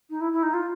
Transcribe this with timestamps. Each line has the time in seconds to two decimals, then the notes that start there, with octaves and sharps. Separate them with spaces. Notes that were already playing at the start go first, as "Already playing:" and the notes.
0.10 D#4
0.21 E4
0.32 E4
0.43 D#4
0.54 F4